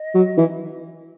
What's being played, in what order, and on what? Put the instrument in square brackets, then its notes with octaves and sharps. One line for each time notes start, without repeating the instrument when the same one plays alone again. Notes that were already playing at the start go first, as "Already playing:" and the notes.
Already playing: [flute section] D#5
[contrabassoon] F#3
E3